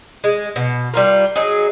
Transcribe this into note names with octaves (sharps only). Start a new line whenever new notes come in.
G#3
B2
G3 F4 A#4
F#3 D#4 G#4